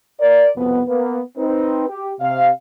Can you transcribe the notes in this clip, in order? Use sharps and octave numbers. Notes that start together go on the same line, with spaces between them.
A#4 D5
C2 F2 B2 B3
A#3 B3 B4
C4 D#4 B4
G4
C3 F5